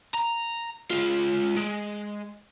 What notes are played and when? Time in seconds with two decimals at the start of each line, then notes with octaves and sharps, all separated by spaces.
0.14 A#5
0.91 G#3 F4
1.56 G#3